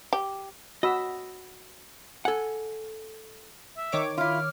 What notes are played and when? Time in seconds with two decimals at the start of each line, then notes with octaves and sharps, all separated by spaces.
0.13 G4
0.83 F#4 D#5 B5 E6
2.25 A4 F#5 G#5
3.75 E5
3.92 D#3 C#5 D6
4.18 E4 F4 F6